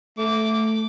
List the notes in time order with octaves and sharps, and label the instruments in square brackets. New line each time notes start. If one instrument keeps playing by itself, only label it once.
[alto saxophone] A3 [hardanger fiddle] D6